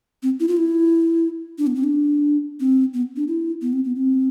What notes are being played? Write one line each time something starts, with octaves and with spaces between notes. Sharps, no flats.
C4
E4
F4
E4
D4
B3
C4
D4
C4
B3
D4
E4
B3
C4
B3
C4